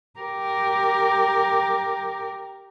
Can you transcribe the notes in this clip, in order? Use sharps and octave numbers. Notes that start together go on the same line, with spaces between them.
G4 A#4